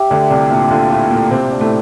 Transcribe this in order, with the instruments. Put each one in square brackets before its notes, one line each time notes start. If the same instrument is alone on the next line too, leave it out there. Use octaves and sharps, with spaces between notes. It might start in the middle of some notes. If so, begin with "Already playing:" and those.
Already playing: [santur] G4 E5
[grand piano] D2 D3 [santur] D4
[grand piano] C2 C3 [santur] D4
[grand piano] A#2 [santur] D4
[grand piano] D2 D3 [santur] F4
[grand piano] A2 A3 [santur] F4
[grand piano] A#2 A#3 [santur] A#4
[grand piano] C3 C4 [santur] G4
[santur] D4
[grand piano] A2 A3